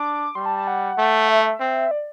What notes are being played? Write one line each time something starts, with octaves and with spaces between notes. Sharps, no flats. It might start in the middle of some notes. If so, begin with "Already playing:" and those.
Already playing: D4 D6
G3 C6
A5
A5
F#5
A3
E5
C4
D5